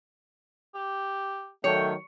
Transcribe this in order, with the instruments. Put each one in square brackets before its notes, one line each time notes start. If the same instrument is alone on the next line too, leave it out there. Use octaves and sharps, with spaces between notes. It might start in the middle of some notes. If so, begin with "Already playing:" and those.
[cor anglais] G4
[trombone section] D#3 F#3 A3 [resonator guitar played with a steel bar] C#5 [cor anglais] G5